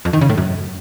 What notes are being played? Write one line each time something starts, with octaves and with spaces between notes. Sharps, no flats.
F2
D#3
C#3
A2
F#2